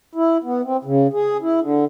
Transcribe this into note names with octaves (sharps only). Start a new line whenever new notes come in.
E4
B3
C4
C#3
G#4
E4
D3